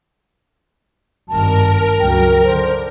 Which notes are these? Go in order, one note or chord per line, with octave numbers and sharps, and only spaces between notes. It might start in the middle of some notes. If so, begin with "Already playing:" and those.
G#1 G2 A#4 A5
C#2 F#3 G5
D3 C5